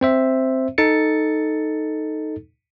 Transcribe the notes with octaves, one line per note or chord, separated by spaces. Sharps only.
C4 C5 E5
D#4 A4 A6 C#7